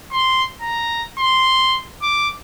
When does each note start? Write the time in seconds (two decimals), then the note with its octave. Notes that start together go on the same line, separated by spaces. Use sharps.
0.12 C6
0.61 A#5
1.19 C6
2.02 D6